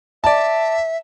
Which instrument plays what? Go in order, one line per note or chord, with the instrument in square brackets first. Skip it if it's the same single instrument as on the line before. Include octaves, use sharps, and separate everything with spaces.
[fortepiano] D5 A5 [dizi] E5